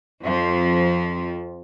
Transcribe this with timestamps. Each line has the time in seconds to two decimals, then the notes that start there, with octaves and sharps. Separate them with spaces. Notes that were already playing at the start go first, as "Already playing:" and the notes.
0.23 F2 F3